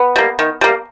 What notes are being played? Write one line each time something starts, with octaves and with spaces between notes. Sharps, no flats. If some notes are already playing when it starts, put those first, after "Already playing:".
Already playing: B3
G3 A#3
D#3
G3 A#3